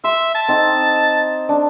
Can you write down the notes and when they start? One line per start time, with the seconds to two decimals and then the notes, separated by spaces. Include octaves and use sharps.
0.04 E5 C6
0.35 A5
0.49 C4 D#4
1.49 D4